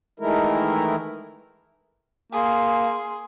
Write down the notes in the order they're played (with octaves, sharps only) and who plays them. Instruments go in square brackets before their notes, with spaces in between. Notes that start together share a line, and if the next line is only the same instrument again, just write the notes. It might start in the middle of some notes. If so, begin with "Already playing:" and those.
[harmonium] D#3 E3 G#3 A3 E4 A#4
[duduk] A#3 [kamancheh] G#4 C6